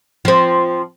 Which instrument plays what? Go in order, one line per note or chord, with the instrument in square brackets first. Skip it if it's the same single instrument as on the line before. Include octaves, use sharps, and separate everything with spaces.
[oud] F3 C4